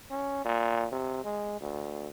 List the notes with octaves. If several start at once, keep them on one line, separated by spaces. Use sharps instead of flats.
C#4
A#2
C3
G#3
D2